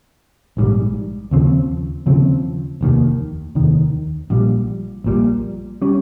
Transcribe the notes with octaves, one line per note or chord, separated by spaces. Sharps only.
A#1 G#2 D#3 G3
D#2 C#3 F3 C4
D#2 C#3 F3 C4
F1 D#2 D#3
F1 D#2 D#3
A#1 A#2 G3
A#1 A#2 G3
G3 C#4